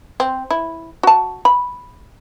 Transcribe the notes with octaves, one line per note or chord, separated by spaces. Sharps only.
C4
E4
F#4 A5
B5